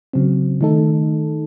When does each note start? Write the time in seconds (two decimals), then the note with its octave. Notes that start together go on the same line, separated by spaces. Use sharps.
0.13 C#3 F#3 C4
0.61 D#3 A3 D#4 A4